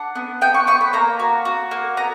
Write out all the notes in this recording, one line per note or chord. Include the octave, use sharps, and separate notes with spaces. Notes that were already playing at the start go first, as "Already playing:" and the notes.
Already playing: D4 F#5
B3
B3 G5
C#6
B3 C#6
B5
A#3 A#5
F#4
F#4
A#3
B3 A#5